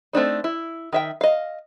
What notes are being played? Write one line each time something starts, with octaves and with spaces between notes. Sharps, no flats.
A3 C4 D4 D#4
E4
D#3 E5 G5
D#5 F5